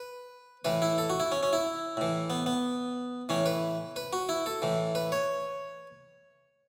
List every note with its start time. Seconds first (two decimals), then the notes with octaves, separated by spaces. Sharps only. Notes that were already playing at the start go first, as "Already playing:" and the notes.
Already playing: B4
0.65 A2 E3 B4
0.82 E4
0.98 A4
1.10 F#4
1.20 E4
1.32 C#4
1.43 C#4
1.53 E4
1.97 A2 E3
2.30 B3
2.46 B3
3.29 A2 E3 C#4
3.46 B4
3.96 B4
4.13 F#4
4.29 E4
4.46 A4
4.62 A2 E3
4.95 B4
5.12 C#5